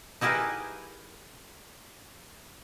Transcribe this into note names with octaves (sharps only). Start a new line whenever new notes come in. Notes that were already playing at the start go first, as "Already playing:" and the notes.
D#4 E4 G4 G#4 A#4 B4